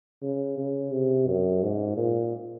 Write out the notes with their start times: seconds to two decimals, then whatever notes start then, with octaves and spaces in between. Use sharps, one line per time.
0.23 C#3
0.58 C#3
0.92 C3
1.28 F#2
1.63 G#2
1.97 A#2